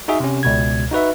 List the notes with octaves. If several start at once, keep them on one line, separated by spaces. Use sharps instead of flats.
D#4 F#4 G#4 E5
C3 C#4
C#2 B2 G#6
D#4 F#4 B4 E5